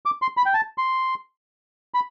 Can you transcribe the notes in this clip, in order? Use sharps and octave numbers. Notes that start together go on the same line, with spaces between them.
D6
C6
B5
G5
A5
C6
B5